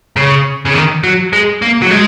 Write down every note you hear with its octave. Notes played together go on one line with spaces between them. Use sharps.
C#3
C#3
D#3
F#3
G#3
A#3
F#3
G#3